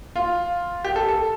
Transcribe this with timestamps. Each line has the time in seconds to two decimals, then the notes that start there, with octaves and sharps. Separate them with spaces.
0.16 F4
0.84 G4
0.96 A4
1.09 A4